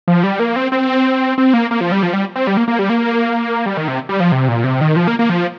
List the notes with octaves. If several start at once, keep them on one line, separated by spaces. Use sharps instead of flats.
F3
G3
A#3
C4
C4
C4
A#3
A#3
F3
G3
F3
G3
C4
G3
A#3
A#3
G3
A#3
G3
D#3
C3
G3
F3
C3
A#2
C3
D#3
F3
A#3
A#3
F3